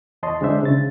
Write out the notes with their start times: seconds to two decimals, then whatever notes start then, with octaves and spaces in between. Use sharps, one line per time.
0.23 E2 C#5 D#5 A5 C6
0.41 D3 G#3 D4 C5 E5
0.63 C#3 A6